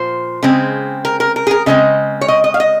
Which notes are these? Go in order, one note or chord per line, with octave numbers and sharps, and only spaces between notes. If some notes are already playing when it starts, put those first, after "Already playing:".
Already playing: A#2 F3 C5
C#3 G#3 C4
A#4
A#4
A#4
G#4
A#4
C#3 G#3 C4 D#5
C#5
D#5
D#5
F5
D#5